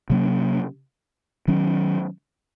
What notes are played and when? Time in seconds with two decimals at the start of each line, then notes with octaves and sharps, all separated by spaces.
0.10 C3 F#3 A#3 C#4
1.48 D#3 F#3 C#4